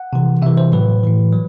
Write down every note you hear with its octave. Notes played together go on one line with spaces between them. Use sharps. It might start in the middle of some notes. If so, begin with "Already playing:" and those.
Already playing: F#5
C3 E3
C3 E3 E5
C5
A2 F#3 B4
A2 E3
F#3